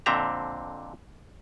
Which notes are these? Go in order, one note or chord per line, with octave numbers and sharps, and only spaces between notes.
F2 A#2 D3 C4 E5 A#5